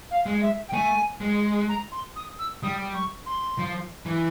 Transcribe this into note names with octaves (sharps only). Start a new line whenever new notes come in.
F5
G#3
E5
G5
A3 G#5
G#3
A#5
C6
D#6
E6
G3 D#6
C#6
C6
F3
E3